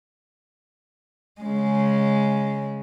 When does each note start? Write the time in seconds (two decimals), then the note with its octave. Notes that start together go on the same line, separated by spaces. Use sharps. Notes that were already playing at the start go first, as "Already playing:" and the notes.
1.41 C#3 G#3